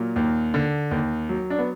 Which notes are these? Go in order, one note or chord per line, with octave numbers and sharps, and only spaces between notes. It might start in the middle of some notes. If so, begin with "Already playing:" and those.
Already playing: A#2 F#3 A#3
D#2
D3
D#2
F#3
D4
B3